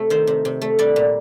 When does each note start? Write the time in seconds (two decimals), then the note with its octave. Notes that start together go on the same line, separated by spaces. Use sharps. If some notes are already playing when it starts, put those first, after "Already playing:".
Already playing: C3 A3
0.10 D#3 C5
0.27 C3
0.45 C3
0.62 A3
0.79 G3 D5
0.96 A#2